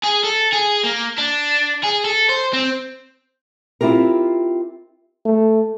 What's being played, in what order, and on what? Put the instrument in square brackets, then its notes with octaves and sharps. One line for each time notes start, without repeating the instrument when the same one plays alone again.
[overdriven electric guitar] G#4
A4
G#4
A#3
D4
G#4
A4
C5
C4
[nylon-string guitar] C4 E4 F4 G4 A#4
[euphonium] A3